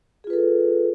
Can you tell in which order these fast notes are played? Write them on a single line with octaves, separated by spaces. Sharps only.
G#4 F4 B4 A4